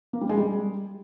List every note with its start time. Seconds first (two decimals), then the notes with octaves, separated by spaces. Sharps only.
0.13 A#3
0.21 G3
0.29 G#3
0.37 G3